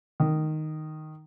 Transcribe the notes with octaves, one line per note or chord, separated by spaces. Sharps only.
D#3